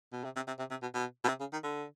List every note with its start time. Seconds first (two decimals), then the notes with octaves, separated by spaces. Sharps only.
0.13 B2
0.24 C3
0.36 C3
0.47 C3
0.59 C3
0.71 C3
0.82 B2
0.94 B2
1.24 B2
1.28 C3
1.40 C#3
1.53 D#3
1.63 D3